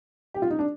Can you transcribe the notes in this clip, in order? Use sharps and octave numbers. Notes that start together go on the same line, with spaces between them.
G4
F4
D#4
D4